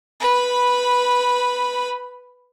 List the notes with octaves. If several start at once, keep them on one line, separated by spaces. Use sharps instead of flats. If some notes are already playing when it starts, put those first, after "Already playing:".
B4 B5